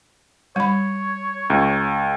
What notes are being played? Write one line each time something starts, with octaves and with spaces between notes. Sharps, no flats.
G3 C#5 B5
C#2